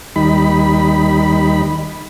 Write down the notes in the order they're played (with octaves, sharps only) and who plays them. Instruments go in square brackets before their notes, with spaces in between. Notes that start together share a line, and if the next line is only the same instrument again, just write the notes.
[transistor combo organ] D#2 G3 D#4 B5